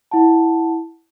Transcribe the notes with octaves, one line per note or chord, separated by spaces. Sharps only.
E4 F#5 A5